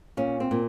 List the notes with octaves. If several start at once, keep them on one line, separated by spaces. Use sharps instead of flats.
A#2 C#4
C4
A#2